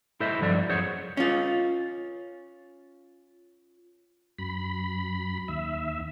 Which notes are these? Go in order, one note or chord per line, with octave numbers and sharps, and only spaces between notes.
E4 A4 C5 D#5 E5
G2 F3 F#3 D5
F#2 G#4 C5 C#5 F#5
C#4 F4
F#2 B5
D#2 E5